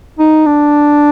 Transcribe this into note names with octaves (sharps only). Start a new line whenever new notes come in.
D#4
D4